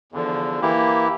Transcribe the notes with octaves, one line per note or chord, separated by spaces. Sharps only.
E2 D3 F3
E3 A#3 E4 G4